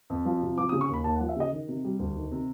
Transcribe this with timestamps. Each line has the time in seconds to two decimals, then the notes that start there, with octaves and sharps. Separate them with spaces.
0.10 F2
0.25 F3
0.42 C3
0.58 F3 D6
0.69 D#6
0.73 C#3
0.81 C#6
0.89 D#2 B5
1.04 D#2 A5
1.16 F#5
1.21 F3
1.29 E5
1.36 C#3 D#5
1.52 D#3
1.68 C3
1.84 G3
1.99 D2
2.16 D#3
2.31 C3